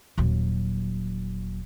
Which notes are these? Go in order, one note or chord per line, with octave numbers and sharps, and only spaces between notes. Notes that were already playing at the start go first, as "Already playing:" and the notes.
D#1 F#3